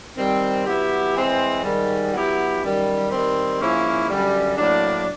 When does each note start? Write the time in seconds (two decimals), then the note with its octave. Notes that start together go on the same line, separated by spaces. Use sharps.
0.17 D#3 G3 C4
0.66 F#3 B3 E4 G4
1.14 E3 G#3 C4
1.63 G#2 D#3 G3
2.14 F#3 B3 E4 G4
2.62 F#2 D#3 G3
3.11 D#3 G3 C4
3.60 G#2 F3 A#3 C#4 E4
4.10 F#2 D3 G3
4.58 A2 F#3 A#3 D4